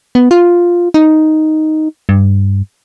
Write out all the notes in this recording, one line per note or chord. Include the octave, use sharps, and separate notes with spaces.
B3
F4
D#4
G2